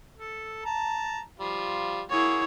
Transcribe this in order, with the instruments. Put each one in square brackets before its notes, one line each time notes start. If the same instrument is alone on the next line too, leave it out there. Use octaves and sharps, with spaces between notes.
[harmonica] A4
A5 A#5
F3 G3 F4
[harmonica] A#3 F#4 G#4 [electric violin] E4 C#5